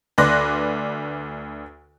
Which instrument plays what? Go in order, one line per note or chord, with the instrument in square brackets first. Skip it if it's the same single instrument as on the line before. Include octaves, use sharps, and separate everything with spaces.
[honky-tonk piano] D2 B4 D5 C6 F#6 A#6